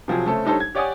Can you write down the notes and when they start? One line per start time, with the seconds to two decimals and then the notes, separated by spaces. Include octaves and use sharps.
0.08 C3 F3 F#3 G#4
0.26 C#3 A3 C4 C#4 A4
0.45 G3 D4 D#4 A4 C5 C#5
0.60 G#6
0.75 G4 C#5 D5 F#5 G#5 D#6